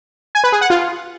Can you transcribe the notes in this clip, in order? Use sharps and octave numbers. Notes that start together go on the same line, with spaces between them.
G#5
B4
G#4
F#5
F4